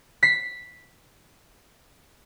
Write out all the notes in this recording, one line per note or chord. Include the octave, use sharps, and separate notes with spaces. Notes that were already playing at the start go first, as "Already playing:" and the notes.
B6 C7